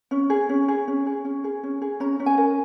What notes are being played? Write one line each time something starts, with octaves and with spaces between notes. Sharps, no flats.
C#4
G#4
C#4
G#4
C#4
G#4
C#4
G#4
C#4
G#4
C#4 A#5
C#4
G#5
A#4